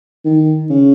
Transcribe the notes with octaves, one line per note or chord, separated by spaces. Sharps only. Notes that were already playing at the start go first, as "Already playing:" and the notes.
D#3
C#3